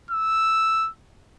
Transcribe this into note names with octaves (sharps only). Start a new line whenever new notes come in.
E6